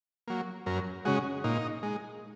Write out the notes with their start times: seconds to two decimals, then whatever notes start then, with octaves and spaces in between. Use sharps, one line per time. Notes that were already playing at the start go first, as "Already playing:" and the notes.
0.28 F#3 A#3
0.66 F#2 A#4
1.05 C#3 G#3 F#4
1.44 A#2 D#4
1.83 G#3